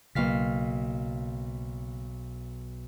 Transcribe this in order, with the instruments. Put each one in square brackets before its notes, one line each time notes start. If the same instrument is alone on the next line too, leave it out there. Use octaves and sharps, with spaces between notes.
[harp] B1 F5 B6 [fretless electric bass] C#3 A#3